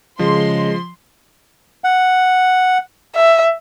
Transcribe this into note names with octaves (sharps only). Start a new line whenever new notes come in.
C#3 F3 G#3 C6
F#5
E5